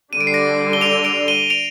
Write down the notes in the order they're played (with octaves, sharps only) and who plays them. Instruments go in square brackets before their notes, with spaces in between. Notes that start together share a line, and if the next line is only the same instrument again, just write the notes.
[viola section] D3 G3 D4 [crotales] D#7
[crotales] D7
C7
A#6 D7
G7
D7 F7
D7 F7
D#7 G7
D7 F7